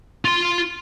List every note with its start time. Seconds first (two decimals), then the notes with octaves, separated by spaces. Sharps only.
0.25 F4 C6